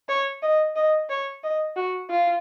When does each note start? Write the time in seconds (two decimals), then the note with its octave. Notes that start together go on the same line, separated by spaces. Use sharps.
0.09 C#5
0.42 D#5
0.76 D#5
1.10 C#5
1.43 D#5
1.76 F#4
2.10 F4